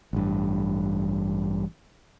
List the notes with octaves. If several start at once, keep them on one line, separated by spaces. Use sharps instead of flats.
A1 G2